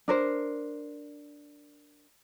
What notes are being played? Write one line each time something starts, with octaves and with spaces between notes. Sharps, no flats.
D4 A#4 C5